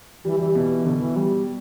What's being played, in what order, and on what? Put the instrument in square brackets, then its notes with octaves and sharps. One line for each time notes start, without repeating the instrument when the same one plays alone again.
[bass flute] E3 [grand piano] G3
[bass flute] E3 [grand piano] G3
[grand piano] B2 [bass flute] E3
[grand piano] B2 [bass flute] D3
[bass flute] E3
G3